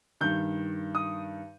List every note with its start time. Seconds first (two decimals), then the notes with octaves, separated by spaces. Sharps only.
0.21 G2 D#3 G6
0.95 D#6